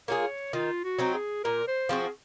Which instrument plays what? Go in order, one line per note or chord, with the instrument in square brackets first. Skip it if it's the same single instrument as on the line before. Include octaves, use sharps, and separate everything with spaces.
[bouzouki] A#3 F4 G#4 [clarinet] C#5
[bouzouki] D#3 [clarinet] F4
[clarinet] F#4
[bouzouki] F#3 C4 D#4
[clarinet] G#4
[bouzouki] A#2 [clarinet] A#4
[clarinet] C5
[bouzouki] F3 C4 F#4 [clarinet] G#4